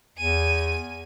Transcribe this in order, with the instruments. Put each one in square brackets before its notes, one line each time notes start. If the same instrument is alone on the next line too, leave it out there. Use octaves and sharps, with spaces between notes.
[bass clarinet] E2 [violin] G#5 D#7